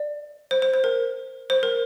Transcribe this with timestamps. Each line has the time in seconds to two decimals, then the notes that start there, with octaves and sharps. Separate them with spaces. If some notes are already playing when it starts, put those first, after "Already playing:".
Already playing: D5
0.51 C5
0.62 C5
0.74 C5
0.84 A#4
1.50 C5
1.63 A#4